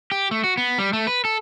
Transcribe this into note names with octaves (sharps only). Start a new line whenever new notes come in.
G4
A3
F#4
B3
G3
A3
B4
A4